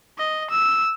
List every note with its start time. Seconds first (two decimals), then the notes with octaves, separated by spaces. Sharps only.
0.18 D#5
0.51 E6